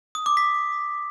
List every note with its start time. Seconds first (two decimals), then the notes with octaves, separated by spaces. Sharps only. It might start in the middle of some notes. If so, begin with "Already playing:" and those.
0.15 D#6
0.26 D6
0.37 B6